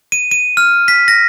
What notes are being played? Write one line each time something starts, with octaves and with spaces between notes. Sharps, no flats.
D#7
D#7
F6
B6
A#6